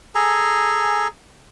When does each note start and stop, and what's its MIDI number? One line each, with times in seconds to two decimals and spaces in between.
0.15 1.08 68
0.15 1.08 69
0.15 1.08 80
0.15 1.08 82